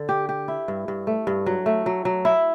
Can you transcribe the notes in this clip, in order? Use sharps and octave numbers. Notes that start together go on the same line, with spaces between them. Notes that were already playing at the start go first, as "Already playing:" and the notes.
Already playing: D3
G4
G4
E4
G2
G2
A3
G2
F#3
A3
F#3
F#3
E4